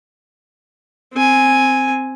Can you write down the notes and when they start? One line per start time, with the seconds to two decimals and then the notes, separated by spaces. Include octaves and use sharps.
1.13 C4 G#5